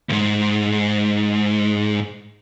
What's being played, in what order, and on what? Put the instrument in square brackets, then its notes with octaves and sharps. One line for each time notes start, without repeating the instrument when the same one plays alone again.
[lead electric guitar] C#2 G#2